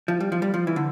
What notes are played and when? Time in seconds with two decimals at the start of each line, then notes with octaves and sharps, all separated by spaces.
0.08 F3
0.20 G3
0.32 F3
0.42 G3
0.54 F3
0.67 E3
0.76 D3